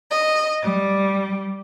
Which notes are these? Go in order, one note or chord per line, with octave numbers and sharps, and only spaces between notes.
D#5
G3